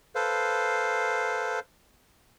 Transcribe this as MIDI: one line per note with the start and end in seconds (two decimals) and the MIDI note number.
0.15 1.60 69
0.15 1.60 71
0.15 1.60 72
0.15 1.60 77